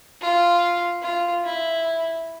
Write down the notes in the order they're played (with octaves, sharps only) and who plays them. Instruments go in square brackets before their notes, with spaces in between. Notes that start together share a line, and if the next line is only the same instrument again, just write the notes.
[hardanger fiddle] F4
F4
E4